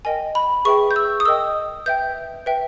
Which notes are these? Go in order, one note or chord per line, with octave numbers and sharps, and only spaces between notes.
A#4 D#5 G5 G#5
B5
G#4 B4 E5 G5 C#6
G6
E6
D#6
A#4 D#5 G5 E6
B4 E5 G5 G6
B4 E5 G5